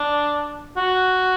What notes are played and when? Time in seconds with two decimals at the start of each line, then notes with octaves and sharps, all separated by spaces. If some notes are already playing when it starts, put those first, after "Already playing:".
Already playing: D4
0.77 F#4